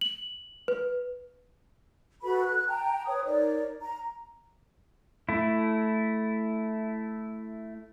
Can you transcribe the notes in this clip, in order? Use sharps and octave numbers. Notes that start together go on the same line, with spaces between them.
F#7
B4
F#4 A4 B4 B5
F#6
G5 A5 A#5
B4 C#5 D#6
D#4 A#4 C#5 D5
A#5
A3 E4